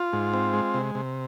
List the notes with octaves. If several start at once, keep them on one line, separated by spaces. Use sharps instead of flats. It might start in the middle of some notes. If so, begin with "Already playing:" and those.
Already playing: F4
G#2
C4
G#3
C3
C3